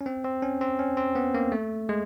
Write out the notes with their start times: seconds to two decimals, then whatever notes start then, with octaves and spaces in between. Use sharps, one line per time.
0.01 C#4
0.06 C4
0.24 C4
0.42 C#4
0.61 C4
0.79 C#4
0.97 C4
1.15 B3
1.34 A#3
1.52 A3
1.89 G#3